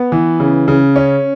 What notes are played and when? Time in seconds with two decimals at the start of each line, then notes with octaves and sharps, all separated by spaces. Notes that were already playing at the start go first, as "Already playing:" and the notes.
Already playing: B3
0.12 E3
0.40 C#3
0.68 C#3
0.96 C#4